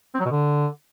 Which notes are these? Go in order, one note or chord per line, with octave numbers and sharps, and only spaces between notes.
C4
F#3
B2
D3